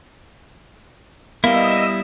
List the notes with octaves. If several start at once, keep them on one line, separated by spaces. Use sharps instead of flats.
G3 A#3 B3 E4 D#5 E6